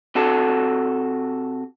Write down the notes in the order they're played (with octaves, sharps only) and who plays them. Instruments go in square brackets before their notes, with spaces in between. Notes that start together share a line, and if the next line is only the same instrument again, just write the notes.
[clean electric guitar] C3 F#4 A4